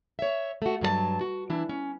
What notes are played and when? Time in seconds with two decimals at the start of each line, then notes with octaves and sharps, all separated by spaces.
0.19 C#5 E5
0.62 A3 F#4
0.81 G2 F#3 G#4 A5
1.21 F#4
1.50 E3 D4 E4
1.69 C#4